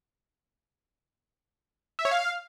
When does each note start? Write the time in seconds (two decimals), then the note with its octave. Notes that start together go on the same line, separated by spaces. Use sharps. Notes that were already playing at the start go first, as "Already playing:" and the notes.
1.99 E5
2.05 C#5
2.11 F5